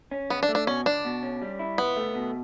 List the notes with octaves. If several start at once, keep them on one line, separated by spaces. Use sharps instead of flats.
C#4
C#2 B3
D4
A3
D4
B2 C#4
C#2 D4
B2
C#4
G3
E4
C#2 B3
A3
B2